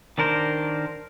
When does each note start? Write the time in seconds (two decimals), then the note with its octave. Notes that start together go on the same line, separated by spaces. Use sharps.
0.18 D#3 D4 A#4 C5